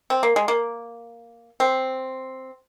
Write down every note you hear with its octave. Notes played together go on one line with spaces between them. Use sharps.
C4
A#3
G#3
A#3
C4